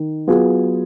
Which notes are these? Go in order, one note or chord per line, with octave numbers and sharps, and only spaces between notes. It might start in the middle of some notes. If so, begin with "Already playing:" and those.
Already playing: D#3
F#3 B3 F4 G#4